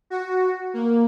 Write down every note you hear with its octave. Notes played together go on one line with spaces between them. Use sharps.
F#4
A#3